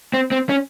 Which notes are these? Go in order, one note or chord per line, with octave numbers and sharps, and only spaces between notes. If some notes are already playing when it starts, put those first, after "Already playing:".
C4
C4
C#4